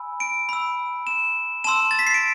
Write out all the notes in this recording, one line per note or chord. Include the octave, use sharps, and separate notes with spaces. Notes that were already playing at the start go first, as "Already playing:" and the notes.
Already playing: G#5 B5 E6
D7
B5 E6
E7
A5 C6 E6 E7
A6
B6
C7
D7